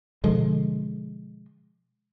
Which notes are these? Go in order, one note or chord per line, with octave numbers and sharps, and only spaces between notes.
B2 D3 F3 G#3